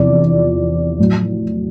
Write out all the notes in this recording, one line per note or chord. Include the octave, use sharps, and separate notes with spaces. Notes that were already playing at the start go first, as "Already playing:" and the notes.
Already playing: E2 C3 F3 D5
A2 F#3